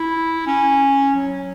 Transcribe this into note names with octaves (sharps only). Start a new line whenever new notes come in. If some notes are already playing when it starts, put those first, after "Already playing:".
Already playing: E4
C#4
F#3